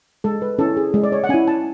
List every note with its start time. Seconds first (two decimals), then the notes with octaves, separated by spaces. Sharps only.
0.24 G#3 A4
0.42 B4
0.59 C#4 E4 A4
0.77 G#4
0.94 G#3
1.04 D5
1.12 C#5
1.24 F#5
1.29 C#4 E4 G#5
1.48 A5